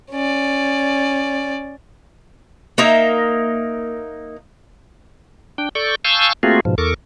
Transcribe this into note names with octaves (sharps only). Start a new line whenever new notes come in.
C#4 D5
A#3 D#4 A#4 E5
D4 G5
A4 D5 C#6 G6
F5 G#5 A5 C#6 E6 G6
A3 A#3 C4 F4 F#4 G#4
G#2 B2 F3
E2 A4 A#4 C#6 D6